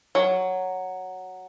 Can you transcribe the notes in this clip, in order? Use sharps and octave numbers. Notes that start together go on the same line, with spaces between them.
F#3